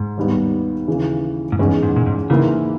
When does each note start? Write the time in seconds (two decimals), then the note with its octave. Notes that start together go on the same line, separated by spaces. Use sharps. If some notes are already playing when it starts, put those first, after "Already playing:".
Already playing: G#2
0.17 D#2 D#3 G3 B3
0.88 D#2 C#3 E3
1.52 G#2
1.59 E2 G2 D#3 G#3 C#4
1.83 G#2
1.96 A#2
2.06 G#2
2.30 G#2 C#3 E3 A#3 E4